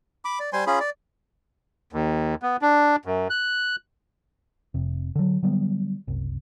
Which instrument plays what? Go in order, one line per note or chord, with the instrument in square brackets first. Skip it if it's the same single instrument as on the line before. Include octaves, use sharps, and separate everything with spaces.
[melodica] B5 D6
D5
G3 C5 G#5 C6
C#4 F4 G#4 B5
D5
[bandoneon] D#2
B3
D4
F#2
F#6
[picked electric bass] F1 C3
D3 F#3
D3 F#3 G3 B3
F#1 C2